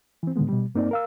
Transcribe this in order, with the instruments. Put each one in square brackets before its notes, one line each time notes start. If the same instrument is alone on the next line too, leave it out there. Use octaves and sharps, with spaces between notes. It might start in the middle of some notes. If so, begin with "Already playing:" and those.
[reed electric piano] E3 C4
A2 D3 D#3 G#3 B3
B2 G3
G2 A#3 C4 D#4 A#4 D5
A#4 F5 E6